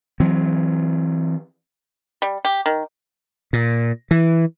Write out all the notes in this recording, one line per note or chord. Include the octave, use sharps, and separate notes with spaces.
E3 F#3 C4
G3
G4
D#3
A#2
E3